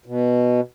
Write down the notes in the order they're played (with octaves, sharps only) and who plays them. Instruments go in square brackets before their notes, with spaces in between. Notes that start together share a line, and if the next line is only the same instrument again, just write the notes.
[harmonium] B2